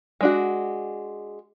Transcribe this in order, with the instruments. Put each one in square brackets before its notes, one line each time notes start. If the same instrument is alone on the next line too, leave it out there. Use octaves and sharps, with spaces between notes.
[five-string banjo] G#3 D4 F#4